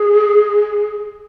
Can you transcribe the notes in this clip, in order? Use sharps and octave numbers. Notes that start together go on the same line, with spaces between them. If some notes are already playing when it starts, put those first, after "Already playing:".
Already playing: G#4